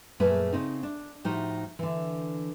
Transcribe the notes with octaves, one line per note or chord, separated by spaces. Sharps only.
F#2 A#2 A3 G#4 B4
C#3 C4 D#4
D4
A2 F3 D#4 F#4 G4
D3 E3